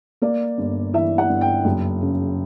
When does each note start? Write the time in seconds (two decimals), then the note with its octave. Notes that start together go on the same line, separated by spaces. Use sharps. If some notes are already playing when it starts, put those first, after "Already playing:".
0.22 A#3 D5
0.58 G1
0.93 E3 E5
1.18 F#5
1.29 G1
1.41 G5
1.65 F#1
2.01 C#3